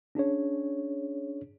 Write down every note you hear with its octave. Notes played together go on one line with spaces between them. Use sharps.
C#4 D4 G#4 C#5